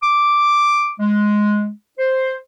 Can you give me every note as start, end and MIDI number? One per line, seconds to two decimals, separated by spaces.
0.02 0.93 86
1.00 1.69 56
1.98 2.36 72